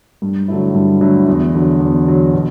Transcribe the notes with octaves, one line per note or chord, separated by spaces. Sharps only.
G2
D3 F#3 A3 E4
G2
D3 F#3 A3 E4
E2
D3 F#3
E2
D3 F#3
B2